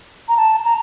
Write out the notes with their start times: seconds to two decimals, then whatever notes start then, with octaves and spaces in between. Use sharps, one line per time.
0.28 A#5
0.37 A5
0.64 A#5